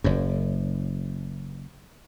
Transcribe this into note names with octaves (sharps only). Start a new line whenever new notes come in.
F#1 F#2